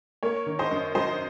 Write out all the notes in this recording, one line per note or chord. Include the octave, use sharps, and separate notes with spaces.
A#3 A#4 C#5
D#3
C5 D#5
F#2
F#3 C5 D#5